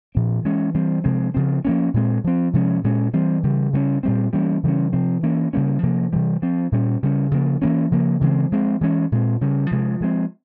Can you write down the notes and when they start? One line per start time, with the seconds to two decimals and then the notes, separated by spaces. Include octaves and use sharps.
0.15 A#2 F3 C4
0.44 E3 G#3 C#4
0.74 E3 G3 C4
1.04 C3 F3 G#3 C4
1.34 C#3 F3 C4
1.65 F3 A#3 C#4
1.94 A#2 G#3 C4
2.24 F3 C4
2.53 C3 F3 G#3 C#4
2.84 A#2 G#3 C#4
3.13 E3 G3 C4
3.43 C#3 E3 G3
3.73 C#3 G3 A#3 C#4
4.03 A#2 G3 C4
4.33 E3 G3 A#3 C#4
4.63 C#3 E3 G3 C#4
4.93 C3 F3 C4
5.23 E3 A#3 C#4
5.53 C#3 G3 A#3 C#4
5.83 C3 F3 A#3
6.12 C3 E3 G3
6.42 F3 C4
6.72 A#2 G3 C#4
7.03 C#3 G3 C#4
7.31 C#3 F3 A#3
7.62 E3 A#3 C#4
7.91 C#3 F3 A#3
8.21 C#3 E3 G#3 C4
8.52 F3 G#3 C4
8.81 E3 G#3 C#4
9.12 A#2 G#3 C4
9.41 C#3 G3 C#4
9.71 C3 F3 G#3
10.00 F3 G#3 C4